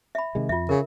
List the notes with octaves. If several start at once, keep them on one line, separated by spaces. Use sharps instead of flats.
E5 B5
C3 D#3 G#3
F2 F4 E5
C#3 A#4